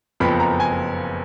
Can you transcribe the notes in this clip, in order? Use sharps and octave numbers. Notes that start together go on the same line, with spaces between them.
F#1 F2 F3 B3 B5
A#5
G#5